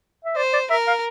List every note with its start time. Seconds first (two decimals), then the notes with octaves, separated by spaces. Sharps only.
0.25 E5
0.37 C5 D5
0.53 D5
0.70 A#4 E5
0.87 F5